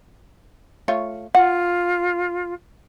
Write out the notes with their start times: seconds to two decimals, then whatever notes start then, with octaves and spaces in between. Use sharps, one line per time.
0.88 A3 F4 C#5
1.35 F4 F#5